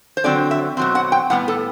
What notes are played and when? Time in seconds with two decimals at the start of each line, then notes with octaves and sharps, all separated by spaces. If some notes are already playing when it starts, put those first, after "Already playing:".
0.17 C5
0.24 D3 F#3 C4 D5
0.51 E5
0.77 B2 F#3 C4
0.95 F#5
1.12 G5
1.30 A2 G3 B3 F#5
1.48 A4